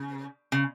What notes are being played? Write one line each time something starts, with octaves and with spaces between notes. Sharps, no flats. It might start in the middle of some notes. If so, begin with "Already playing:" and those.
Already playing: C#3
C#3